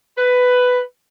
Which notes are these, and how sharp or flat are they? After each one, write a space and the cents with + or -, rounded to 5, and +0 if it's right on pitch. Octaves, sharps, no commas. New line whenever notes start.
B4 +10